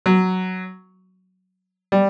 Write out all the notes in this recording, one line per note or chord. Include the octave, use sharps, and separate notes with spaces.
F#3
G3